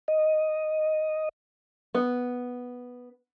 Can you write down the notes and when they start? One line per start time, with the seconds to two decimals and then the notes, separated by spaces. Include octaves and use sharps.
0.08 D#5
1.95 B3